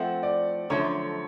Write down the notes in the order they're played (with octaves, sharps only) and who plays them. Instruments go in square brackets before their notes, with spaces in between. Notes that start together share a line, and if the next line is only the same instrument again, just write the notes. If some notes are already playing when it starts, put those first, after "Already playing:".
Already playing: [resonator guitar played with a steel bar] F3 A3 C4 [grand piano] F#5
[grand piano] D5
[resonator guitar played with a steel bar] F#2 D3 F3 A3 [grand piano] C#5